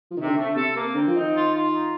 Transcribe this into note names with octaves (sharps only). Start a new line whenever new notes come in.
F3
C3 D#3
D3
A3
D3
C3 A4
A#3
D3 C4
F3
D#4
D#3
F4
F4
D#4